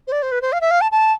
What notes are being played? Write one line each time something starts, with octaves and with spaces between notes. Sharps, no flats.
C5
D5
C5
B4
C5
F5
E5
F5
A5
A5